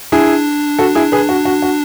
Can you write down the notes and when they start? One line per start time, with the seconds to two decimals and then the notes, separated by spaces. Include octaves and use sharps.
0.12 D4 E4 G#4
0.79 F#4 A4
0.95 E4 G#4
1.12 G#4 B4
1.29 F#4
1.45 F#4
1.62 F#4